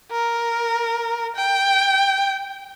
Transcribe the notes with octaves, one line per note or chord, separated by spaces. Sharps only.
A#4
G5